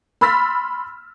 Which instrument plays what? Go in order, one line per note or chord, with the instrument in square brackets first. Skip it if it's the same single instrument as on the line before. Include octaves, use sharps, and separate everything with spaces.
[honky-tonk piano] B5 C6 E6 F6 A6 B6